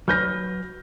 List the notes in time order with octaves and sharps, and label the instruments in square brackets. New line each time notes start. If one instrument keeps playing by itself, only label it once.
[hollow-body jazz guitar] F#3 B4 [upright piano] F6 G6 A#6